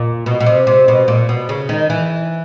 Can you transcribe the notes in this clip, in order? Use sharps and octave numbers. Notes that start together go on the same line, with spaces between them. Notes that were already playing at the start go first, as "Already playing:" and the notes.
Already playing: A#2
B2
B2
C3
C3
B2
A#2
B2
C#3
D#3
E3